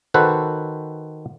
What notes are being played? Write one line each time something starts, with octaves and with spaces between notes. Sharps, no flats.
D#3 F#4 A4 B4 C5